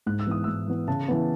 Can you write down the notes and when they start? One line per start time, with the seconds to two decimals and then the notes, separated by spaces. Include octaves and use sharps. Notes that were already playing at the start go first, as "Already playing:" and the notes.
0.06 G#2 F#6
0.19 E6
0.27 E3 B3 D#6
0.44 G#2 E6
0.68 E3 B3
0.88 C#3 A5
1.08 E3 B3